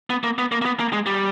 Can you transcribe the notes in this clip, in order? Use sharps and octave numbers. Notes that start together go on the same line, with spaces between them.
B3
A#3
B3
A#3
A#3
B3
A#3
G#3
G3